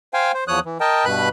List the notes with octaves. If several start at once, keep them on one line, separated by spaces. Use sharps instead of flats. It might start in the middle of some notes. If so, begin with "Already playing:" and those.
C5 F5 G5 G#5
C5
E2 F3 C#5 D#6 F#6
E3
A#4 D#5 G5 A5
G2 B2 B4 B5 F#6